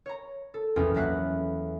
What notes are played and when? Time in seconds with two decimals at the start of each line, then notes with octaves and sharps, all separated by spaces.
0.06 C#5 A#5
0.54 A4
0.76 A#1 E2 C#4 F4 G5
0.94 E2 F#3 A#3 E5 F5 F#6